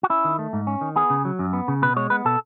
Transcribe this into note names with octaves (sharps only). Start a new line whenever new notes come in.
F#4
C#4 E4
D#3
A3
G#2
C#4
D#3
B3 G#4
C#3
F#3
F#2
B3
C#3
B2 B4
G#3 C#5
B3 B4
B2 A4